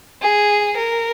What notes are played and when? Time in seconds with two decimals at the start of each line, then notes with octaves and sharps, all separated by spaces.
0.21 G#4
0.76 A#4